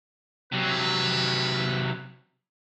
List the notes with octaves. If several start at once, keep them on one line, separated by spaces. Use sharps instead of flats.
C3 F#3 B4